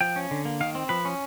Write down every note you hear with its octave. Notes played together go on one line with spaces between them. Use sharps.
F3 G5
C#4
D3
A#3
D#3 F5
C4
F3 B4
C#4